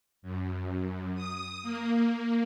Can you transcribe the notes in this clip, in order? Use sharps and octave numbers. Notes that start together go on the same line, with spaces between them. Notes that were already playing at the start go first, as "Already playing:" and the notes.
F#2
D#6
A#3